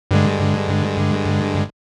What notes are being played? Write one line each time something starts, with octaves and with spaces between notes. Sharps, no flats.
G2 D3 G#3